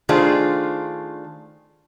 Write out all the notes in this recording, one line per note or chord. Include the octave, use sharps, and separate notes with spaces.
D#3 A3 D4 F4 G#4 C5